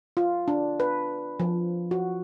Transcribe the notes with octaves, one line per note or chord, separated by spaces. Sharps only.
F4
D4
B4
F3
F#4